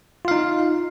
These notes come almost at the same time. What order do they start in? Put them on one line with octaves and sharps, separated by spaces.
F4 F5 D#4